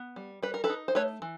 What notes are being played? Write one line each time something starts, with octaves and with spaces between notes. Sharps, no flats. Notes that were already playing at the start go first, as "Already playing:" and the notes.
Already playing: B3
G3
G3 B4
A#4
A4 B4
D#4
C5
A3 B4 C#5
E3